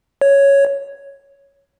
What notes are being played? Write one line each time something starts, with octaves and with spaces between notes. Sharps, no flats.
C#5